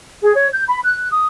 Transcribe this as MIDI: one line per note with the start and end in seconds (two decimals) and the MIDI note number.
0.23 0.33 68
0.35 0.49 73
0.53 0.64 91
0.68 0.80 83
0.83 1.09 90
1.10 1.27 87